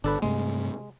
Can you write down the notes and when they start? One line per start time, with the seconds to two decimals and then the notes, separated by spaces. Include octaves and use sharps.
0.04 G1 D3 D4 A4 B4
0.22 G2 C3 G#3 A3